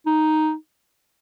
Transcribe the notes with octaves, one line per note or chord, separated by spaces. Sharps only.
D#4